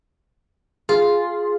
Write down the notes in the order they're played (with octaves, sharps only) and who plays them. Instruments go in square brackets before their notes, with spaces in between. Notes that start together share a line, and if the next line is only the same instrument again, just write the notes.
[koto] F4 [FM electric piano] G#4